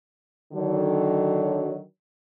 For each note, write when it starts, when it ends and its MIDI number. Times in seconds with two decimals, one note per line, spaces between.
0.53 1.80 50
0.53 1.80 51
0.53 1.80 54